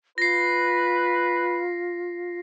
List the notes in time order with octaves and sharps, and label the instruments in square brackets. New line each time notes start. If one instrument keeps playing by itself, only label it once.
[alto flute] F4 [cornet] B4 [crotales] A#6 C7